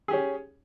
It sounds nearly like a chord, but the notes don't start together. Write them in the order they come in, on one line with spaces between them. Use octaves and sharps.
G#4 G4 C#4